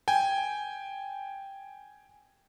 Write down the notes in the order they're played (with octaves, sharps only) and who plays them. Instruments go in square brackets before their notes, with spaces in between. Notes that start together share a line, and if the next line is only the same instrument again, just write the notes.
[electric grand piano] G5 G#5